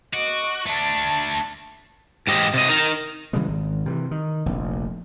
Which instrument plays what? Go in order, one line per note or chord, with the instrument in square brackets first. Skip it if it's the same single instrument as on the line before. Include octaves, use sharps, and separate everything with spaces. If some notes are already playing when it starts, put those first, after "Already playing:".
[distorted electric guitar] F#4 [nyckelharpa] D#5 D6
[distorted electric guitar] A3 D4 [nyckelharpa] A5
[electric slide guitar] G#2 G4 D#5
C3 D#5
D#4 A#4
[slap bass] C#3 E3 G3 G#3
G#1
C3 D#3 E3
D#3
F1 A#1